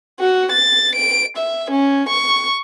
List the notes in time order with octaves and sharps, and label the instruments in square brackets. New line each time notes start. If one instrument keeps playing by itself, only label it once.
[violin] F#4
A6
D7
E5
C#4
C#6